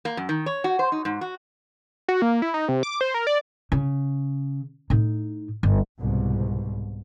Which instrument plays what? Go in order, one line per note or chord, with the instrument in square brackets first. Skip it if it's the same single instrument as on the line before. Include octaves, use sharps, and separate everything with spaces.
[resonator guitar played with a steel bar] A#3
F#2
D#3
C#5
F#4
C5
D#4
G#2
F#4
[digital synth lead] F#4
A#3
E4
D#4
C3
D6
C5
A#4
D5
[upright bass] C#3
A2 D#4
G1
[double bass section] C2 G#2 B2